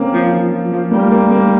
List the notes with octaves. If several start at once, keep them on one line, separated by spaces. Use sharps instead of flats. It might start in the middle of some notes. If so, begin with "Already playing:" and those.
Already playing: A#3 C4 C#4
F3
F3
F3
F3
G3 A#3
A#3
A#3